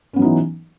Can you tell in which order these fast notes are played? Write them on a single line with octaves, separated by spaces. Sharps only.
C#4 B3 F#3 D#4 E3